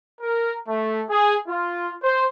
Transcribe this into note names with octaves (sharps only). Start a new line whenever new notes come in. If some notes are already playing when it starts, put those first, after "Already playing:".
A#4
A3
G#4
F4
C5